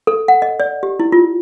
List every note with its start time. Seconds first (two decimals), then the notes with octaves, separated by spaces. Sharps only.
0.07 A4
0.28 F#5
0.42 D#5
0.60 D5
0.83 G4
1.00 E4
1.12 F4